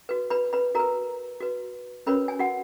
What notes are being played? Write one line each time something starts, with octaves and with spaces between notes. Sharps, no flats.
F#4 B4
B4 B5
B4 B5
F#4 A#4 B4 A#5
F#4 B4
C#4 F#4 A#4 B4 C#5 B5
G#5
F#4 F#5